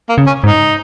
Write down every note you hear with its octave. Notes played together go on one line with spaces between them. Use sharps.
A#3
C#3
C#4
G#2 D#4